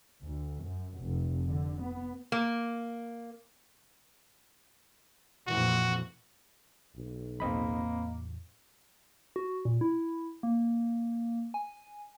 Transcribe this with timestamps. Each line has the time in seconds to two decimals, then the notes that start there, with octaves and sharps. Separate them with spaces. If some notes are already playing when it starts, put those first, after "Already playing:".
0.24 D2
0.64 F#2
0.99 F1
1.48 D3
1.81 B3
2.32 A#3
5.47 F2 A#2 E3 F#4
6.96 B1
7.40 E2 A2 E3 A#3 C4 D#5 B5
9.36 F#4
9.65 A#2
9.81 E4
10.43 A#3
11.54 G#5